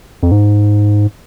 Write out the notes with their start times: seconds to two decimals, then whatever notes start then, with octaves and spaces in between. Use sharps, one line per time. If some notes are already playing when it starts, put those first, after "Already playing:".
0.23 F2
0.31 G#2